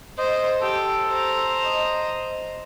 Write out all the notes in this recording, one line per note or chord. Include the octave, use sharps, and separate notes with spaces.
C5 D#5
G4 A4
C5 A#5
D#5